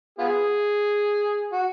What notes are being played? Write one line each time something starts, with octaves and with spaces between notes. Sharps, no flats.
B3 F4 G#4
F#4